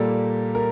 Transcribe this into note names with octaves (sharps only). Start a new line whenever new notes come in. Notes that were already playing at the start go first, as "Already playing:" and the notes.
Already playing: A#2 G3 A#3 A4
A#4